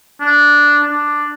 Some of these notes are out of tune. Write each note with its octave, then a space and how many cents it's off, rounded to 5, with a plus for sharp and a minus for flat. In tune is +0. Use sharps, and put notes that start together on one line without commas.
D4 -5
D4 +5